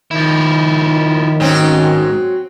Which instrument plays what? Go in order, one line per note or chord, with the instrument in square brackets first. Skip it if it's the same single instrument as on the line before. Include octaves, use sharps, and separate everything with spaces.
[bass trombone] D#3 [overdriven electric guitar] F3 E4
[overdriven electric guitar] G#2 [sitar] F#3 C4 C#4